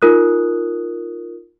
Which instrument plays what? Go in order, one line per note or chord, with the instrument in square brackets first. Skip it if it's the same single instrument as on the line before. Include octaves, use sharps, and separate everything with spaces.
[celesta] D#4 F4 A#4 D#6 F#6